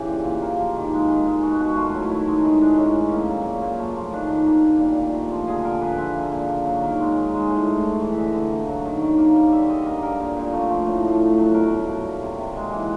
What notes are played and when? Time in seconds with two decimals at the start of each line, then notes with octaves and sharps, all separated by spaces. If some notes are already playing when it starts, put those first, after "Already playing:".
Already playing: C#3 E3 G4
0.08 A#2
0.25 A#2
0.42 A#3
0.59 F3
0.76 D#3
0.93 G#3
1.10 D#3
1.27 G#3
1.43 B2 F#4
1.60 B2 F#4
1.77 A3 F4
1.94 F#3 E4
2.11 D#3 E4
2.27 G#3 D#4
2.45 D#3 E4
2.61 G#3 D4
2.78 A2 C#4
2.95 A2
3.12 A#3
3.29 F#3
3.45 A#2
3.62 A#2
3.79 A3
3.97 F3
4.13 D#3 D4
4.30 D#3
4.46 A#3
4.64 G3
4.80 A#2
4.97 A#2
5.14 A3
5.31 F3
5.47 D3 G#4
5.65 D3 A#4
5.81 A#3 B4
5.98 F3 E5
6.16 A#2
6.32 A#2
6.49 A#3
6.65 F#3
6.82 D#3 A#4
7.00 G#3
7.16 D#3
7.33 G#3
7.50 A2
7.67 A2
7.83 A3
8.01 E3
8.12 E5
8.17 D3 D#5
8.34 D3
8.51 A#3
8.67 F#3
8.85 D#3
9.02 D#3
9.18 A#3
9.35 G3
9.52 D3 E5
9.69 D3 D#5
9.86 A#3 D#5
10.03 G3 A#4
10.20 A#2
10.37 A#2
10.53 A3
10.70 F3
10.87 A2
11.04 A2
11.21 A3
11.38 F#3
11.54 B2 A#4
11.71 B2
11.88 A#3
12.05 G3
12.22 C3
12.39 C3
12.56 G#3
12.72 E3